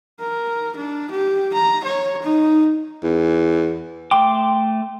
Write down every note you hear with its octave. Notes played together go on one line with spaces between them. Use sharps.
A#4
D4
G4
A#5
C#5
D#4
E2
A3 G5 C6 D6